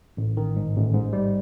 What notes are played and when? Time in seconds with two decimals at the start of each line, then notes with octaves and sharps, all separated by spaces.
0.17 A1
0.37 D#3
0.56 G#2
0.75 A1
0.94 G#2
1.13 G3